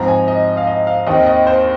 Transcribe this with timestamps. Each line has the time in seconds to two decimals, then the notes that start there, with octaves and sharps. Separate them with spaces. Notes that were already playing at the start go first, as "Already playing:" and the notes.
Already playing: G#2 F3 C4 A#5
0.08 G#5
0.28 D#5
0.57 F5
0.67 D#5
0.87 F5
1.07 D#2 D#3 C4 D#5
1.26 D#5
1.47 C5